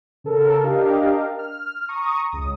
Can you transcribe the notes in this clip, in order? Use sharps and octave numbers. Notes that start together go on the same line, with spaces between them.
C#3 A4 A#4
D4 G4 A#4 D#5 F5
F6
A#5 C#6 D#6
C#2 D#6